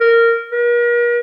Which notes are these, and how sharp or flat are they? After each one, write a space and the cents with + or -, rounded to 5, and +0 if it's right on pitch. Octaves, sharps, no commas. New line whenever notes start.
A#4 -10
A#4 +40